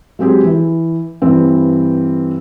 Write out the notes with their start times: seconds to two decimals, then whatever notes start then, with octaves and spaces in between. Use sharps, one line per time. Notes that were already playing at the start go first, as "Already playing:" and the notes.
0.19 F#3 G#3 C4 G4 G#4
0.43 E3
1.22 G2 E3 C4